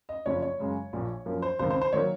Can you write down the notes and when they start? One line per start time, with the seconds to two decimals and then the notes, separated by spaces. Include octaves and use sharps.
0.09 D#5
0.26 F#1 F2 C#3 F3 C#5
0.42 C#5
0.59 F#2 C#3 G#3
0.93 A#1 A#2 F3
1.26 F#2 F3 A#3
1.42 C5
1.59 C#2 C3 D#3 C5
1.70 C5
1.82 C5
1.93 D#3 F#3 A#3 C#5